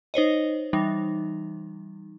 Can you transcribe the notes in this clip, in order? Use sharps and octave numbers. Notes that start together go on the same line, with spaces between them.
D#4 C5 C#5 D#5
E3 G3 D#4